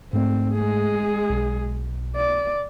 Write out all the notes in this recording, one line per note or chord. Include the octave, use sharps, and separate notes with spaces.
G#2 A3 C4
G#3 G#4
B1 B2
D5